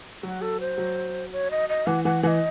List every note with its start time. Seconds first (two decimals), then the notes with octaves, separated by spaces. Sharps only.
0.23 F#3 F#4
0.42 A4
0.60 C5
0.78 F#3
1.32 C#5
1.51 D#5
1.69 D#5
1.87 E3 F#5
2.04 E3 F#5
2.23 E3 D#5 F#5